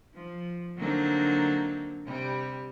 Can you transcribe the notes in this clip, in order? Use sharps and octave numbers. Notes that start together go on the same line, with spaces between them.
F3
D3 F#3 A#3 C4 D4 D#4
C3 G3